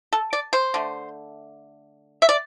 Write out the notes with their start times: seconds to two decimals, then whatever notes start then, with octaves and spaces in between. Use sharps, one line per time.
0.13 A4
0.33 D5
0.53 C5
0.74 D3 A3
2.22 E5
2.29 D5